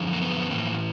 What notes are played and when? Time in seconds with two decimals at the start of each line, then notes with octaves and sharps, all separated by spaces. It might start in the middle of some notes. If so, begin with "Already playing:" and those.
Already playing: F#2 D3 F3
0.13 A#3
0.22 B3
0.50 A2 E3 A#3